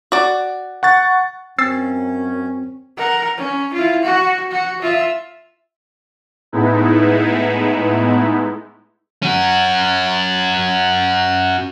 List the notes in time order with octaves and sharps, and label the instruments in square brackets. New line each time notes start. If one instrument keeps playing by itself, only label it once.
[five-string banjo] F#4 D5
[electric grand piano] F#5 C#6 A6
[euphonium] F#2 [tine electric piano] C4 [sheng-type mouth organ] C#4 [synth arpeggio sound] E6 A6 C7
[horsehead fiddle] A#4 F#5
C#4
E4 F4
F#4
F#4
F4 E5
[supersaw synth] A2 G#3 B3 D#4 E4
[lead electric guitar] C#4 F#4